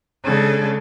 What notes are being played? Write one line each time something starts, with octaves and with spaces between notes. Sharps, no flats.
C#3 G#3 D4 A4